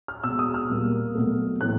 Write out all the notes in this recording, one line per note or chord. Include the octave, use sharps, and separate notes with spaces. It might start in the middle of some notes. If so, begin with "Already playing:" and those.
F6
B2 G#3 E6
D#6
F6
A#2 G3 A#3
B2 F#3 A3
A2 E3 A3 F#6